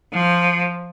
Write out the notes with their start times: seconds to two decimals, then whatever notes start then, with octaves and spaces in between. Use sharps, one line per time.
0.13 F3